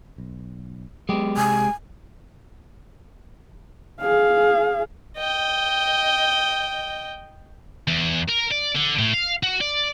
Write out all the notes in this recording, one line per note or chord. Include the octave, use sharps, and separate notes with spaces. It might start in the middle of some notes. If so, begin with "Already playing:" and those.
B1
F#3 G#3 B3 G4
C3 G#5
G#4 F5
D#5 G5
E2
A#4
D5
D3
A2
F5
F#4
D5